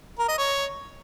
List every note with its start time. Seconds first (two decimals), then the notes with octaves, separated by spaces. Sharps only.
0.19 A#4
0.28 D#5
0.38 C#5